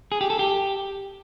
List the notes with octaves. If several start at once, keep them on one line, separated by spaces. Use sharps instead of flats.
G#4
G4
A4
G4